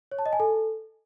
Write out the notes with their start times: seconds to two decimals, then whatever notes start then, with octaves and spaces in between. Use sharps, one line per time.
0.12 C#5
0.19 A5
0.26 D#5
0.33 G#5
0.40 A4